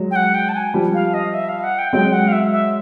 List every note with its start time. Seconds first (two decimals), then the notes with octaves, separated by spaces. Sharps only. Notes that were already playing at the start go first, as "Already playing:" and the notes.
Already playing: F#3 G#3
0.11 G5
0.16 F#5
0.34 G5
0.49 A5
0.54 G#5
0.74 F3 G3
0.94 F5
1.14 D#5
1.34 E5
1.49 F5
1.64 F#5
1.78 G5
1.92 F#3 G#3 G5
2.13 F#5
2.28 F5
2.33 E5
2.52 E5